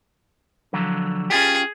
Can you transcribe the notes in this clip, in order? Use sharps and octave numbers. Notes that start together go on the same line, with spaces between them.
D3 F3 F#3
C#4 F4 G4 G#4